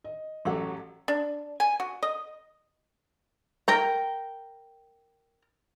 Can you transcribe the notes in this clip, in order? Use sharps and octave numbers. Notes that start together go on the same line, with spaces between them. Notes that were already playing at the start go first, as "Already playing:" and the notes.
D#5
A1 F#3 G4 A4 F#5
D4
G#5
F#4
D#5
A#4 G5 A#5